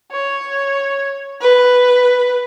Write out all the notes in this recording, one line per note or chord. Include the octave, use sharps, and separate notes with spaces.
C#5
B4